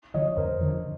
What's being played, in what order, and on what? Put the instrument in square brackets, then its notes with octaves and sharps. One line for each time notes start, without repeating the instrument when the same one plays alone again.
[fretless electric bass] D3 F3 [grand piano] C#5 D#5
[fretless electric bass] F2 [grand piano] A#4 C5
[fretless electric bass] D3 F3